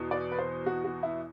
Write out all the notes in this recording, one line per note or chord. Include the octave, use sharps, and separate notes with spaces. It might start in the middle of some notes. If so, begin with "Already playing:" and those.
Already playing: E2 B2
D5
B4
C5
F#4
F#4
E4